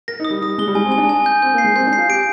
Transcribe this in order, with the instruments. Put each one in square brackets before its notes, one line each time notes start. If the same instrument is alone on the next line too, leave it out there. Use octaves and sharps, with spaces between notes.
[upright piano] A#4 [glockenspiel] A#6
[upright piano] D#4
[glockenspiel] D#6
[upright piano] G3
[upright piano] G3 [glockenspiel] D#6
[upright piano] G#3 [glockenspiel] G7
[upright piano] G3
[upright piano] G#3 [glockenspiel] G#5
[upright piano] C4
[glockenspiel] G#5
[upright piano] D4
[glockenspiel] G#5
G6
[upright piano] C4 [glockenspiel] G6
[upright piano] A#3
[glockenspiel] C7
[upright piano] G#3
[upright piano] C4 [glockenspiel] G6
[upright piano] D4
[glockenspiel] C7
[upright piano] F4
[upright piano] G4 [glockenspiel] D7